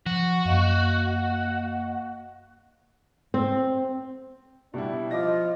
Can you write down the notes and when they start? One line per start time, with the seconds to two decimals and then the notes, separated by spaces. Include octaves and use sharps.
0.06 F3 F#4
0.45 F#2 A#3 D#5 F5
3.34 C4
4.74 B2 G3 D4 E4 G4
5.11 F3 F4 D#5 D6 A#6